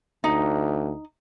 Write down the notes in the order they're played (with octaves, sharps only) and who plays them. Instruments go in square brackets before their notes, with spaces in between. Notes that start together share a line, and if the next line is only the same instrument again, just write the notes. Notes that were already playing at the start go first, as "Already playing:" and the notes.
[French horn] D2 [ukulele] D#4